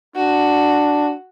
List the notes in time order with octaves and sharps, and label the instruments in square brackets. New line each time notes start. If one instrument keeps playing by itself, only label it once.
[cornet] D4 [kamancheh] F#4